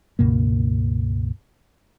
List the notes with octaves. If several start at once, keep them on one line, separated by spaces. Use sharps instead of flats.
C#2 G2 B2 A#3